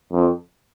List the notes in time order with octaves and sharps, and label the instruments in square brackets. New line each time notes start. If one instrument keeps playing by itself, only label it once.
[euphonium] F2